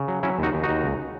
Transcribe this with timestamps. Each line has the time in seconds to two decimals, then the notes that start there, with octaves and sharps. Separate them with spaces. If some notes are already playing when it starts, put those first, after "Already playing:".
Already playing: C#3
0.08 F#3
0.23 F#3 C#4 E4
0.39 D#2 D#4 F#4
0.54 D#2
0.63 D#4 F#4
0.69 D#2
0.84 C#2